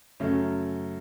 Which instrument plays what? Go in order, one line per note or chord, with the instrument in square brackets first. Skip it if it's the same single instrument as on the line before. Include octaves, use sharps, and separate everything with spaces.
[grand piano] F#2 C#3 F#3 A3 C#4